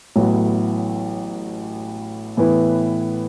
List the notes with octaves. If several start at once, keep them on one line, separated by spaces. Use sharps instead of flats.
A1 A2 F#3 B3
A2 E3 B3 E4 B4